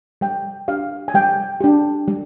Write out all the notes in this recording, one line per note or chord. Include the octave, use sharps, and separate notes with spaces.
G3 G5
D4 G4 F5
G#5
G3 G5
D4 G4
G3